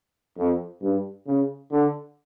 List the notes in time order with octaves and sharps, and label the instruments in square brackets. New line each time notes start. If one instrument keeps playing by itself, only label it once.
[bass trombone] F2
G2
C#3
D3